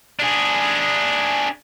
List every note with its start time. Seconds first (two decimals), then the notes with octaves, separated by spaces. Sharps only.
0.20 D4 G#4